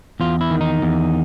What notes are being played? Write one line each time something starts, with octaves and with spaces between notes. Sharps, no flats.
E2 F4
E4
D#3
D#4
E2